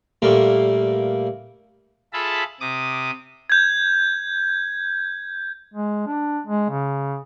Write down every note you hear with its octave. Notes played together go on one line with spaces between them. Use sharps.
A#2 G3 A3 A#3
F4 G#4 A4 E5 A5 B5
C3 D6 D#6
G6 G#6
G#3
D4
G#3
C#3